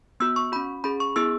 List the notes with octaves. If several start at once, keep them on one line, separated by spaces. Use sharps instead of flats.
B3 F#4 E6
C#6
C#4 F#4 B5
C#4 G#4 B5
C#6
B3 E4 G#4 E6